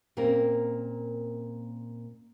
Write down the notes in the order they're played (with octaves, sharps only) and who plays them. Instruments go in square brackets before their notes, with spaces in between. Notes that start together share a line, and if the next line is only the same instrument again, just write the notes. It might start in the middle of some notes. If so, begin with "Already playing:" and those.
[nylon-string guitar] A#2 A#3 C4 C#4 A#4